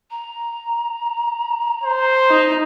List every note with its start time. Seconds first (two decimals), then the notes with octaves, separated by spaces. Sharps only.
0.11 A#5
1.83 C5
2.30 D#4